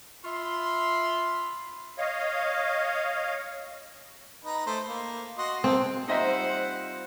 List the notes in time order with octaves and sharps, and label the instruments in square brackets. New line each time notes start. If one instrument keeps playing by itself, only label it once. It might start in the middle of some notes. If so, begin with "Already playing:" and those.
[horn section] F4 E5 B5 C6
[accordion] C#5 D#5 F5
[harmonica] D#4 B4 A#5
A3 C5
A#3
F#4 D#5 C6
[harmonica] A#3 A4 [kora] C4
[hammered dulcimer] G3 C4 F4 [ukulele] D#4 D#5 E5 [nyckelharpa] C5 F#5